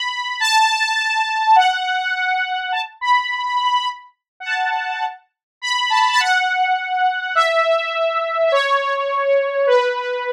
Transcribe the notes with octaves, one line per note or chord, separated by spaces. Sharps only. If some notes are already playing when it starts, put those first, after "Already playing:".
Already playing: B5
A5
F#5
A5
B5
F#5
A5
B5
A5
A5
F#5
E5
E5
C#5
B4